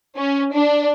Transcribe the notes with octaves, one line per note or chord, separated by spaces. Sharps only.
C#4
D4